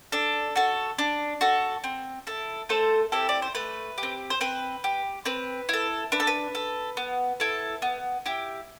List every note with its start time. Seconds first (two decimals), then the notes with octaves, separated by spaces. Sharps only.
0.12 D4 A4
0.56 F#4 A4
0.98 D4
1.41 F#4 A4
1.84 C4
2.27 E4 A4
2.69 A3 A4 C5
3.12 C4 E4 G4 A4
3.29 D5
3.42 C5
3.55 A3 B4
3.98 G4
4.03 C4
4.30 C5
4.41 C4 B4
4.84 G4
5.25 C4 B4
5.69 E4 A4
6.12 D4 B4
6.20 A4
6.27 B4
6.55 A4
6.97 B3
7.40 E4 A4
7.82 B3
8.26 E4 G4